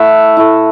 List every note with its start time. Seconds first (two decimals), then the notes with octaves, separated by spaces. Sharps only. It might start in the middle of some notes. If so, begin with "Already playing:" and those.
Already playing: A3 E4 E5 F#5
0.37 A3 E4